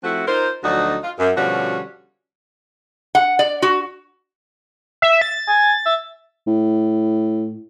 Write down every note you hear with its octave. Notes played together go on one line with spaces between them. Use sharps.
F3 A3 C4 E4 F#4
D#4 F4 A#4 C5
D2 F3 F#3 D4 D#4 F#4
F4
F#2
B2 D3 F3 G3 C#4 F#4
F#5
D5
F#4
E5
A6
G#5
E5
A2